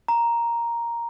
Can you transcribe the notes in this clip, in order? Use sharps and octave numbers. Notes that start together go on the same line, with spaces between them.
A#5